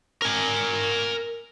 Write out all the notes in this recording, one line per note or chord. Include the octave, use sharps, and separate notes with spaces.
A#4 G#5